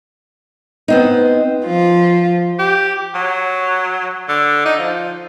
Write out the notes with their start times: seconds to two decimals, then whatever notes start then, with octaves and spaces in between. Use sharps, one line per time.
0.88 B3 C4 D#4
1.63 F3 F4
2.59 G4
3.14 F#3
4.28 D3
4.65 D#4
4.78 F3